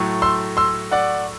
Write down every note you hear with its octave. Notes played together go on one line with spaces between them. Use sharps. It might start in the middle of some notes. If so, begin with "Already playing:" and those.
Already playing: A2 F#3 A3
C6 E6
C6 E6
D5 F#5